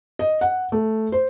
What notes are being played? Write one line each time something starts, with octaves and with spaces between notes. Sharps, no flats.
D#5
F#5
A3
C5